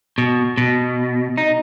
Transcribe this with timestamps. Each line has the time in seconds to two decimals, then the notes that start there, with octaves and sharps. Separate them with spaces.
0.18 B2
0.58 B2
1.38 D#4